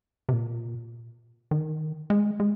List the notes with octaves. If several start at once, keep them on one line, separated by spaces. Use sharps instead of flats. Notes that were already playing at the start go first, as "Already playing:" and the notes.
C3
A#2
D#3
G#3
G#3